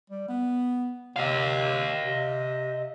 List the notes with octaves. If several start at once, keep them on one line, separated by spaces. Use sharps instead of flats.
G3
B3
C3 D#5 F5
C3